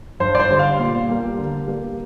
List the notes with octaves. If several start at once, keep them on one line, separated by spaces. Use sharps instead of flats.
G2 C5
D5
C5
D3 G3
F5
A#2
G3 A#3
D3
G3 A#3